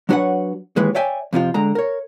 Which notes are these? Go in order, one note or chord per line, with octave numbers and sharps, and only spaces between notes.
F#3 D4 F#4 B4 C#5 F#5
D#2 G#2 E3 G#3 G#4 B4
C#5 D5 E5 G5 G#5
F2 C3 F3 F4
D3 G#3 A#5
A#4 C#5